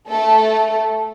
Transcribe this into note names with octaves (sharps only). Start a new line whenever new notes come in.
A3 A4